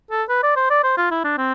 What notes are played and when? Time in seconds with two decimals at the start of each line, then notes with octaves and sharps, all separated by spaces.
0.11 A4
0.29 B4
0.43 D5
0.56 C5
0.70 D5
0.84 C5
0.97 F4
1.11 E4
1.24 D4
1.38 C4